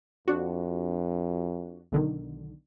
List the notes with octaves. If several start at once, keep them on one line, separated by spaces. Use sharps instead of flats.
F2 D4 F#4
B1 D3 D#3